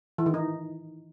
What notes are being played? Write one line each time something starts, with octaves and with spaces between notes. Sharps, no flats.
E3
D#3
D#4